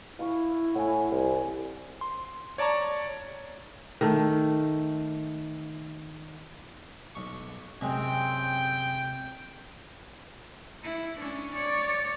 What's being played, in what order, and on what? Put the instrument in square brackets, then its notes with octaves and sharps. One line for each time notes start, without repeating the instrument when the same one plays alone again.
[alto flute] E4 [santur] F5 B5 C#6
[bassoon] A2 [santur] F#5 G#5
[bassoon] C2
[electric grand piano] C6
C#5 D5 A5 A#5 C#6
[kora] D#3 A3
[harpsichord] B1 C#6
[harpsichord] F#2 G#3 [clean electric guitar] C3 [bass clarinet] C4 [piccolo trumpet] G5
[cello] E4
C#4 D4
C#5 D5